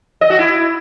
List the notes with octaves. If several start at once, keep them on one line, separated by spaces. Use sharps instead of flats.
D#5
F#4
E4